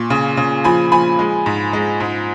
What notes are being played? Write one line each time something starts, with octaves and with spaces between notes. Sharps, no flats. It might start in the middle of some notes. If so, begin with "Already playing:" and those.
Already playing: A#2 C#6
C#3
C#3
F3 G#5 B5
F3 G#5 B5
G#3
G#2
G#3
G#2